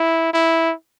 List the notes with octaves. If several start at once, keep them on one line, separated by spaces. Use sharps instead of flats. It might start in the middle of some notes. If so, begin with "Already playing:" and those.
Already playing: E4
E4